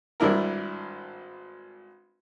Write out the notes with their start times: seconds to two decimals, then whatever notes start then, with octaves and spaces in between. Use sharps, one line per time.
0.20 G#1 G2 D4 E4 A#4